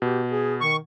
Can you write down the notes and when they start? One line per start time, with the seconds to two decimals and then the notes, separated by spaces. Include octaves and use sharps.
0.02 B2 G4
0.32 G#4
0.61 D#3 C#6